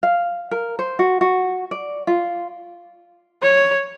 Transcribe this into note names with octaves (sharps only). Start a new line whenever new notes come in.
F5
A#4
C5
F#4
F#4
D5
F4
C#5